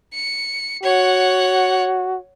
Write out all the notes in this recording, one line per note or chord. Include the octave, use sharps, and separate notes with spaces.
C#7
F#4 C#5 F#5